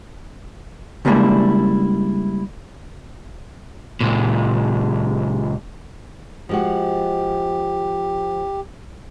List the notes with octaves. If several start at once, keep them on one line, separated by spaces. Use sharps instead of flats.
C#3 G3 G#3 A#3 D4 E4
C#2 A#2
F3 G#3 F#4 G4